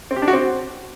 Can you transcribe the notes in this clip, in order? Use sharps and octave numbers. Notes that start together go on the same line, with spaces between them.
C4
G4
D4
F#4
C4